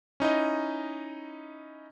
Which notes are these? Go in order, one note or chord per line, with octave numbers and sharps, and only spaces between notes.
C#4 D#4 E4 D#5